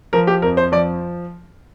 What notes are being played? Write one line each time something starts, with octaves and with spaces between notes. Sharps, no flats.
F3 A#4
G4
F2 A#4
C5
F3 D5